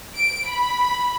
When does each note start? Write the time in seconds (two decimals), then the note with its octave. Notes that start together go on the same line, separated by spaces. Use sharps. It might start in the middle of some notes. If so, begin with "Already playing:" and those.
0.15 D7
0.49 B5